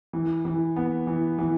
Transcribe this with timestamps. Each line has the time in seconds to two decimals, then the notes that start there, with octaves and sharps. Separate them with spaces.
0.13 E3
0.45 E3
0.76 B3
1.07 E3
1.38 E3